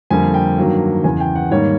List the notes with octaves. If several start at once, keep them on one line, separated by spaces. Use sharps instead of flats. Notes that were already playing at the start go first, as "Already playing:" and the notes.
F2 D3 G3 A#3 G#5
G5
G2 D#3 F#3 A#3
E2 C#3 E3 G#5
G5
F#5
G#2 D#3 G3 A#3 C#5